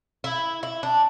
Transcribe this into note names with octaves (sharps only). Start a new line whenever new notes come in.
E4
E4
D4